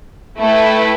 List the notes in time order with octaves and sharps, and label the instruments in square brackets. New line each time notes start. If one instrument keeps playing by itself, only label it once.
[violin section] A3 E4 B4 G5